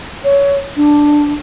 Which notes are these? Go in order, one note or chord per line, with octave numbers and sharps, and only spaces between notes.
C#5
D4